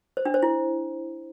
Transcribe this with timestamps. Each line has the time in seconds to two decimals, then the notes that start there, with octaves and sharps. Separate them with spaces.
0.17 C5
0.25 D4
0.34 C5
0.43 E4